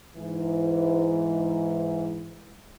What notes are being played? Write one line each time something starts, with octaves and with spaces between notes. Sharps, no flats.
G#2 E3